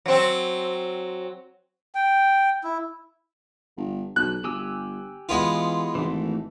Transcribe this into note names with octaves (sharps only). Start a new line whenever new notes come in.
F#3 C4
G5
E4
G1
B1 F#6
G1 G4 G#5 E6
E3 G#3 B3 F4
G#1 E3 A3